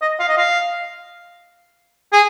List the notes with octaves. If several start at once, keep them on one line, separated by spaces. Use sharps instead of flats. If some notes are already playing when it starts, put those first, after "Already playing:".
D#5
F5
D#5
F5
G#4